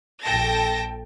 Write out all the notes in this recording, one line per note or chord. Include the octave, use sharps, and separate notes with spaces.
A#1 A4 G5 A5 A#6